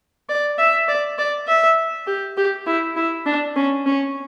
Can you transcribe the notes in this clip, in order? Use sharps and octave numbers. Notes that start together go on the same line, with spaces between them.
D5
E5
D5
D5
E5
G4
G4
E4
E4
D4
C#4
C#4